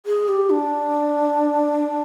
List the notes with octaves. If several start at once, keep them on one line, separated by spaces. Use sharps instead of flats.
G#4
G4
D4